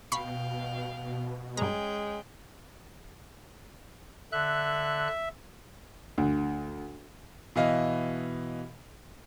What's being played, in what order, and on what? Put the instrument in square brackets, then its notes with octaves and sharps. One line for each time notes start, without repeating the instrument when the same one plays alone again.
[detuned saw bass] B2 [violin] F5 G5 [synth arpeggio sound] B5 C#6 C7
[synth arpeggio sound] G2 A#5 [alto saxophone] G#3 [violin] C#4 G5
[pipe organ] D3 F#6 [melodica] E5
[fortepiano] D2
[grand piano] B2 E3 D#5 F5